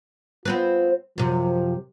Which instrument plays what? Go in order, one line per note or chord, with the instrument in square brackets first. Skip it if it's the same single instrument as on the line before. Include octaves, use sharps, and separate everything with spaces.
[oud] B3 C4 B4 [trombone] F4
[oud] F#2 C3 [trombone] F3